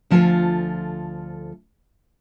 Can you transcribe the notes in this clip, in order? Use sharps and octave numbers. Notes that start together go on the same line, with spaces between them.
D2 F3 F4 A4 G#5